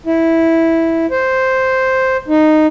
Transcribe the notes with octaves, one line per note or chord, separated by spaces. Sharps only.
E4
C5
D#4